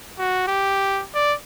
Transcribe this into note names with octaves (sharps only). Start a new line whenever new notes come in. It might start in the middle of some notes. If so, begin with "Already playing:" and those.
F#4
G4
D5